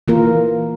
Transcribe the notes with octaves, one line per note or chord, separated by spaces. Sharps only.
E3 A#3 F4 A#4